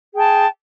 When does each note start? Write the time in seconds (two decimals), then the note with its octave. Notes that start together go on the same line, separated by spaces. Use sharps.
0.13 G#4
0.16 G5
0.19 A5